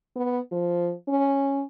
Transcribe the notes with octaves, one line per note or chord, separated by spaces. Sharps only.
B3
F3
C#4